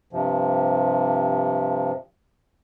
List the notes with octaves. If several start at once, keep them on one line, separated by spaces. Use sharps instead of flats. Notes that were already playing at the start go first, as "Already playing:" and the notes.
G2 C3 F3